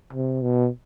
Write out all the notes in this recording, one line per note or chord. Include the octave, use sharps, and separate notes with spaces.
C3
B2